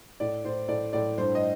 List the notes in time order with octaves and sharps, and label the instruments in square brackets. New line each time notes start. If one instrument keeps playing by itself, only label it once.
[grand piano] A2 D5
A2 C5
A2 D5
A2 D5
G2 C5
D#5